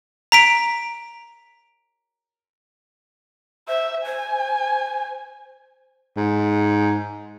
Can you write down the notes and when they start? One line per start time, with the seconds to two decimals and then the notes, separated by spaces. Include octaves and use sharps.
0.32 A#5 B6 D7
3.68 C5 E5
4.06 C5 G#5
6.17 G#2